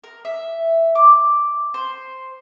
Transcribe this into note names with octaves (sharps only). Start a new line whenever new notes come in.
A#4
E5
D6
C5